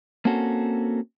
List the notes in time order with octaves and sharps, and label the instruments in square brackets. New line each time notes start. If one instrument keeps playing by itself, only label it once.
[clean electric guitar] A#3 C4 C#4 F#4 A4